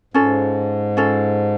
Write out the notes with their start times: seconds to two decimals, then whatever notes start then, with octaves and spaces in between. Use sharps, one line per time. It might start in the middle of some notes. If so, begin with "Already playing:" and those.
0.14 G#2 C#4 F4 A4
0.97 C#4 F4 A4